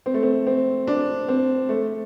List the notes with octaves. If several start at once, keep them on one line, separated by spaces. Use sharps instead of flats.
C4
A3
C4
C4
D4
C4
A3